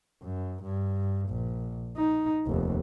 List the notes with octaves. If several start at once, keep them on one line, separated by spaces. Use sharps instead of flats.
F#2
G2
A#1
D#4
F1 D#2